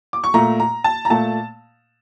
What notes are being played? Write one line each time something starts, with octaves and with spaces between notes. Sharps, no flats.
D6
C#6
A#2 A3 A#5
A#5
A5
A#5
A#2 A3 A5